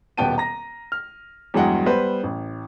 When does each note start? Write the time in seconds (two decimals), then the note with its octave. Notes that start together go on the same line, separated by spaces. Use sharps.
0.18 D#1 B2 B3 G5 A5 D#7
0.38 A#5 A#6
0.92 F6
1.54 E2 G2 F#3 G#3 F#5 G5
1.86 G3 B3 B4 C5
2.23 A1